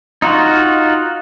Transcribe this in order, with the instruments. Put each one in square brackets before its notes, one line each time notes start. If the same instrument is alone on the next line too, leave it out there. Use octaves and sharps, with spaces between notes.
[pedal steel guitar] D#4 F4 F#4